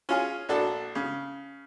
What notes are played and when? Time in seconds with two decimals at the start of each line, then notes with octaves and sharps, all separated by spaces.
0.09 C#4 F4 G#4
0.49 A#1 D4 F#4 A4
0.95 C#3